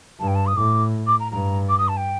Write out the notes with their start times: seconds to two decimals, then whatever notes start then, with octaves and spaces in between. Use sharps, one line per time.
0.19 G2 A5
0.27 G5
0.35 A5
0.46 D#6
0.56 A2 D6
1.06 D6
1.19 A#5
1.31 G2 A#5
1.69 D6
1.78 D#6
1.88 A5
1.97 G5